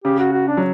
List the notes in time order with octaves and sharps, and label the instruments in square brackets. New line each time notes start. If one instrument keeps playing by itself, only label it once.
[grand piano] C#3 [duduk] G4
[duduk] F#4
F#4
D4
[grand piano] F#3